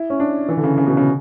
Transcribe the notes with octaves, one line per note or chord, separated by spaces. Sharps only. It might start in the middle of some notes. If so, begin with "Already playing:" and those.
Already playing: E4
C#4
D4
E3
D3
C#3
C#3
B2
C#3